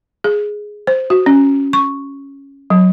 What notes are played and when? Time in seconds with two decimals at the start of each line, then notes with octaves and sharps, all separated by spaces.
0.24 G#4
0.87 C5
1.10 F#4
1.26 C#4
1.73 C#6
2.70 F#3